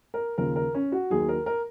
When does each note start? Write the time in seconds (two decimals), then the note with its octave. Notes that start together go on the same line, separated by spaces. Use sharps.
0.14 A#4
0.38 D#2 C#3 F3 A#4
0.56 A#4
0.75 C#4
0.92 F#4
1.10 D#2 D#3 F#3 G#4
1.29 A#4
1.46 A#4